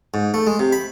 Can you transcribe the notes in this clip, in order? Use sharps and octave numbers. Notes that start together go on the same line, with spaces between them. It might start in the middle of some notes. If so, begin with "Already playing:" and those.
G#2
A3
G#3
C3
B5